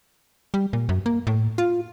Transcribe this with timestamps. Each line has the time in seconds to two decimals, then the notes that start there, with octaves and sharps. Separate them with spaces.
0.54 G3
0.73 A#2
0.89 F#2
1.06 A#3
1.27 A2
1.58 F4